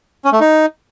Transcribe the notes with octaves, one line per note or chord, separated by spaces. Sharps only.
C#4
A3
D#4